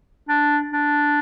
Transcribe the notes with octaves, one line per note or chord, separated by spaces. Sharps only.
D4
D4